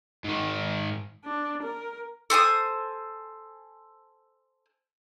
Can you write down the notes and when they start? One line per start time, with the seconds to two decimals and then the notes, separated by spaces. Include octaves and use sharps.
0.24 G#2 D#3
1.24 D4
1.63 A#4
2.30 A4 C5 G#5 D#6